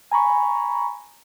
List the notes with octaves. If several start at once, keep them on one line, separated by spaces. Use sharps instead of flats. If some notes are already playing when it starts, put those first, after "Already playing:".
G#5 A#5 B5 C#6